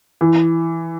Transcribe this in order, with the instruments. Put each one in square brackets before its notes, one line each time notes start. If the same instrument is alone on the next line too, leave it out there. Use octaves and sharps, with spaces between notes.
[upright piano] E3